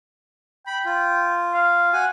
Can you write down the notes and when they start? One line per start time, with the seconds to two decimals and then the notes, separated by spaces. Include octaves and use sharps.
0.67 G5 B5
0.85 F4
1.54 F5
1.93 F#4 G#5